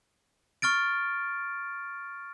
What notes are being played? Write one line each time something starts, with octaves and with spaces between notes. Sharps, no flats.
C#6 F6 A6 D7